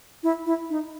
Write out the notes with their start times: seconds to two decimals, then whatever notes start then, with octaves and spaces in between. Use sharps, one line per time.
0.23 E4
0.46 E4
0.70 D#4